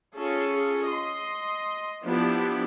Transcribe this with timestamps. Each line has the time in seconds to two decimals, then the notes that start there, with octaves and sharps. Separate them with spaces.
0.16 C#4 F4 G#4 A4
0.88 D#5 C6
2.04 F3 B3 D4 E4 G4